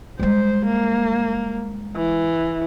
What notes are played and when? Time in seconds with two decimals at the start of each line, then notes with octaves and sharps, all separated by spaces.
0.19 G3 G#3 C5
0.66 A#3
1.96 E3